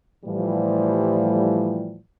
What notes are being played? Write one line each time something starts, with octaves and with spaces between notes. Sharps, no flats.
A2 E3 F3 G3